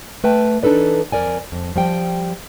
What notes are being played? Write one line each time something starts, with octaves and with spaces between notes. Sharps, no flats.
A3 B4 G5 A5
E3 D4 D#4 A4 B4
F2 F3 A#4 D5 G#5
F2
F3 G3 G5